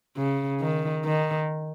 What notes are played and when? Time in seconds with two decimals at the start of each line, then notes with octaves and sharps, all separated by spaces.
0.18 C#3
0.61 D#3
1.05 D#3